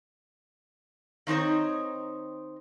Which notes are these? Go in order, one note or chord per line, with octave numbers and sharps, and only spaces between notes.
D#3 C4 D#4 C5 C#5